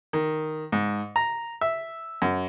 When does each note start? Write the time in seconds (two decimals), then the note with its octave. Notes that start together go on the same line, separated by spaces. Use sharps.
0.13 D#3
0.72 G#2
1.16 A#5
1.61 E5
2.22 F#2